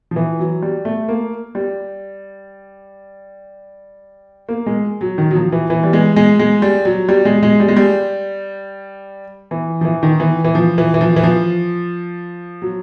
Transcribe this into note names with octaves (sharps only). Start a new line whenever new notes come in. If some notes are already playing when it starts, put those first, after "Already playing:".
F3
E3
F#3
G3
A3
A#3
G3
A#3
G#3
F#3
D#3
F#3
F3
E3
E3
G3
G#3
G#3
G#3
G3
F#3
G3
G#3
G#3
G3
G#3
G3
E3
F3
E3
D#3
E3
E3
F3
E3
E3
F3
E3
F3
F#3